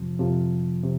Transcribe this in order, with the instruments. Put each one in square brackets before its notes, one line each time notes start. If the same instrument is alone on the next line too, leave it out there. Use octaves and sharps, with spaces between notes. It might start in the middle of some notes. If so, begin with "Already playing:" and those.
Already playing: [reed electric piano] F2 C3 F3
F2 C3 F3
C3